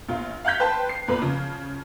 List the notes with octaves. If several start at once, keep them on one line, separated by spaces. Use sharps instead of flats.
A#1 F4
F5 F#5 F#6 G6 B6
B4 C5 G5 A5
C7
E2 A#2 B4 B5
C#3 F3